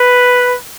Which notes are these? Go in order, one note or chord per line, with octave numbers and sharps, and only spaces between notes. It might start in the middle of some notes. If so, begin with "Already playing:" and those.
Already playing: B4